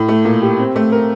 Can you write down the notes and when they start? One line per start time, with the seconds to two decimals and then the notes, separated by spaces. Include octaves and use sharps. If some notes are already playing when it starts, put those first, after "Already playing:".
Already playing: A2
0.08 A3
0.25 A#2
0.42 G4
0.59 C4
0.76 A3
0.92 A#4